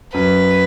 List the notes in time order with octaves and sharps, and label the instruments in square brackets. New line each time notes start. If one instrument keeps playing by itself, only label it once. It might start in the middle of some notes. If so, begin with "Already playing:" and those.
[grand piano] F#2 [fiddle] B4